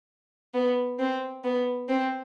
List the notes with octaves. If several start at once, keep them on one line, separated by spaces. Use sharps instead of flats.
B3
C4
B3
C4